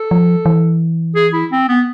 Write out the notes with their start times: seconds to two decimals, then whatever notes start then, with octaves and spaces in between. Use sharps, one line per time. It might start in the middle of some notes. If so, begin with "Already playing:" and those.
Already playing: A4
0.11 F3
0.46 E3
1.15 G#4
1.33 E4
1.52 C4
1.69 B3